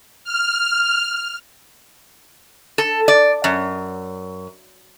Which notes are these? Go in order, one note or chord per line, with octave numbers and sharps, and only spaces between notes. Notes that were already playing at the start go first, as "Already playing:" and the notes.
F6
A4
D5
F#2